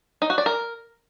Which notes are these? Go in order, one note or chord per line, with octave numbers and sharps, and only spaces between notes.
D#4
F#4
D5
A#4